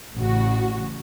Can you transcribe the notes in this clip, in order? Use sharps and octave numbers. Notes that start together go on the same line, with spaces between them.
A1 C#3 F#4